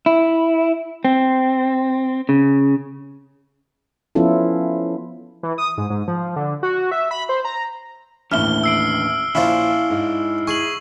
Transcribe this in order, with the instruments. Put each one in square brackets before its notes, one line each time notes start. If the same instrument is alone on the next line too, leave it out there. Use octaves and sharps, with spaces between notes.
[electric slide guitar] E4
C4
C#3
[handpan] F3 B3 C#4 E4 F4 A4
[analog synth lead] E3
D#6
G#2
G#2
F3
D3
F#4
E5
B5
C5
A#5
[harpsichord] A1 [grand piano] D#2 A2 [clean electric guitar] D3 E3 E5 [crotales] F6 G7
[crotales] E6 C7 D7
[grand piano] A#1 C5 [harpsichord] C#4 D4 F4 [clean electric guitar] E4
[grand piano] G#2
[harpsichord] G#4 [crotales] C#6 F#7